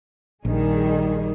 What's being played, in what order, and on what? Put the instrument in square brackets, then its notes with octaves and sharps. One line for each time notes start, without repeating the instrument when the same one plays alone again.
[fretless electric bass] A#1 [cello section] D#3 G3 G#4